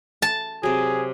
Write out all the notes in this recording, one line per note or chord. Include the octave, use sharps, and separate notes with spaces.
A5
C3 F#3 G#4